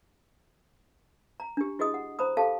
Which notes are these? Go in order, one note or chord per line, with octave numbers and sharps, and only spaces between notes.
A#5
D4 G4
E4 F#4 G#4 D#5 D#6
F#5
C5 A#5 B5 D#6
G4 A4 F5 A5